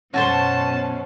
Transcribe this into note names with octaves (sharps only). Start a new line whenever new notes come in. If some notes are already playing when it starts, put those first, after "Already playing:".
F#2 B2 C#4 F#4 A4 C5 A5